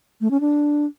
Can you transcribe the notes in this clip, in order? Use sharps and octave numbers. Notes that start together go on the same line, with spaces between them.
A3
C#4
D4